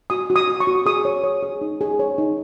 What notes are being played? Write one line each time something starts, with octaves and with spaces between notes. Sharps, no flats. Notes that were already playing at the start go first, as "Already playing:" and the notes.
F#4 D#6
F#4
D#6
F#4
C#6
F#4
G#4 D#6
C#5
C#5
G#4
D#4
G#4
C#5
D#4